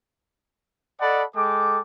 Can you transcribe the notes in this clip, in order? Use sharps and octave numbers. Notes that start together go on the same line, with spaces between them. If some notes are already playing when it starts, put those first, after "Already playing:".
A4 D5 D#5 F#5 A5 B5
G#3 A4 G5 D6